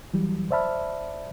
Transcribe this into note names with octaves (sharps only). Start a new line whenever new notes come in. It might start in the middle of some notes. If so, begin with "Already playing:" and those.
E3 F#3 G3
C5 D5 E5 A5 B5 F6